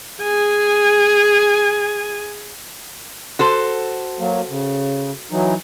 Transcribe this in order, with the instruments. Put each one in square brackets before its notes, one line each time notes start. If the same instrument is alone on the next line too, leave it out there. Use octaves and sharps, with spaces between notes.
[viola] G#4 G#5
[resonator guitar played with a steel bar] F#4 A4 C5
[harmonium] F#3 A#3
C#3
E3 F#3 D#4